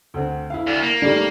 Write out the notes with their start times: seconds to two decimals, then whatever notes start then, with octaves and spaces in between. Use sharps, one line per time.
0.14 D2 C4
0.50 E4 F5
0.67 D2
0.82 A#3
1.02 D#3 G3 A3